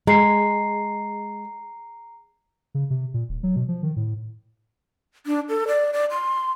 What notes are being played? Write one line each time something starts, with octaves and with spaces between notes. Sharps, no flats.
G#3 A#5 C7
C#3
C3
A#2
D#1
F#3
B2
F3
D#3
A2
D4
A4
D5
D5
C6